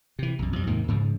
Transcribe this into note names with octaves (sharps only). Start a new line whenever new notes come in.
C3 E3
B1 F#2
F2 G3
D#2 G#2 C3 A#3
G#2 C#3 F3